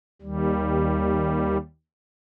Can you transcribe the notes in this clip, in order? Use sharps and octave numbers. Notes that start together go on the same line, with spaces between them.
D#2 G3